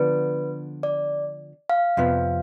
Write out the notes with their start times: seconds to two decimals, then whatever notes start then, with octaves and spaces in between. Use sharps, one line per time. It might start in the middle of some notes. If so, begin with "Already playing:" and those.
Already playing: D3 F3 B3 D4 B4
0.83 D5
1.69 F5
1.97 F2 C3 F3 B3